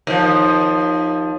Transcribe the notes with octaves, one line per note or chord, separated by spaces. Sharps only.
D#2 F3